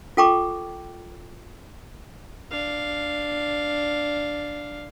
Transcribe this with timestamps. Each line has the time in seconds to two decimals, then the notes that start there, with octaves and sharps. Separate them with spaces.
0.17 F4 A4 G5 A#5 C#6 D6
2.52 D4 F5